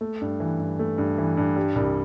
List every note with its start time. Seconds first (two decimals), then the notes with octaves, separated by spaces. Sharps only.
0.01 A3
0.21 G2
0.40 E3
0.59 G2
0.79 A3
0.98 G2
1.18 E3
1.37 G2
1.56 G3
1.75 C2